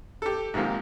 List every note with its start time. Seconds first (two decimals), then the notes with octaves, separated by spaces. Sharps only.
0.22 G4 A4
0.54 G#2 C3 D#3 F3 A#3